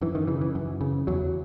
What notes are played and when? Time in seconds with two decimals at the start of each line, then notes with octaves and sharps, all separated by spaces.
0.01 F#2 E3
0.15 D#3
0.27 C#3 E3
0.41 E3
0.55 F#2
0.81 C#3
1.07 E2 F#3